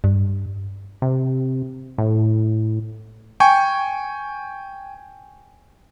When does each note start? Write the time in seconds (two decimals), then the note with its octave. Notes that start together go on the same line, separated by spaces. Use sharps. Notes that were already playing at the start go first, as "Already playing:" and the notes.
0.04 G2
1.02 C3
1.98 A2
3.40 G5 G#5 C#6